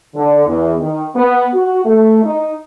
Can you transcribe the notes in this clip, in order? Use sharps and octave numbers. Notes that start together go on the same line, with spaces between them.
D3
E2
D#3
B3
F#4
A3
D#4